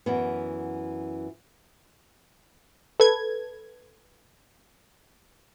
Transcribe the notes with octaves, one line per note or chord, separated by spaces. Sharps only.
F#2 E3 B3
A4 B4 G#6